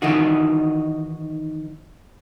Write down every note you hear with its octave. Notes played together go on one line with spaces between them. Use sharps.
D#3 E3 D#4 F#4